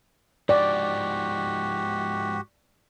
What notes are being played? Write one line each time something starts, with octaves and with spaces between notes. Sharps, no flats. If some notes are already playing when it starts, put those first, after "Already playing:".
G#2 F3 F#4 G4 D5